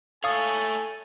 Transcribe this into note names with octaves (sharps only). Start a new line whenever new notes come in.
A3 A4 C#5 F5 G#5 D#6